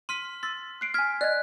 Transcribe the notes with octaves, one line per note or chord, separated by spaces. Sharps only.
C6 F6 B6 D#7
C6 E6 A6
F#6 C7 D7
G#5 F6 G#6 B6
D5 D#5 F#6 G#6